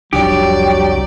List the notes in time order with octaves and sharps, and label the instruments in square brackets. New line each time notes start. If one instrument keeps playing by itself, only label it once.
[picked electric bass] F1 C2 D4 [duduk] F#3 [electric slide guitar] G4 [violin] D5